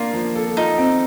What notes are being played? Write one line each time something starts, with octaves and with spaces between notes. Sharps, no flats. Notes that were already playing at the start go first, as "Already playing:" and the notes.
Already playing: A#3 D4 F4
F3
A4
D#4 F4
C4